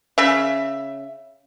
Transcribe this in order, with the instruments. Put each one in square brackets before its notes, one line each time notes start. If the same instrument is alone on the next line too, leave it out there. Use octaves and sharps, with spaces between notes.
[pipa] C#3 E5